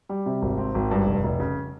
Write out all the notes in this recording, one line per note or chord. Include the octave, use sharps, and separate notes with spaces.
G3
C3
G#1
C4
G#1
G2
F1
F1
C#3